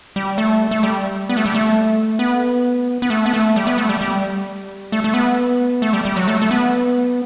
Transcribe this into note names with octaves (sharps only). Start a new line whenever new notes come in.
G3
A3
A3
G3
B3
A3
G3
A3
B3
B3
A3
B3
A3
G3
B3
A3
G3
G3
A3
A3
B3
A3
G3
G3
F#3
A3
A3
B3